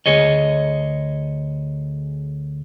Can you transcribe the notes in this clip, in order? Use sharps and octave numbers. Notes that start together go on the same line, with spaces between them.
D2 G#4 C#5 D#5